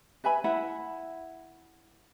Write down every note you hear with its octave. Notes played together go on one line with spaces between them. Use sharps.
B4 E5 G#5 B5
E4 E5 F#5 B5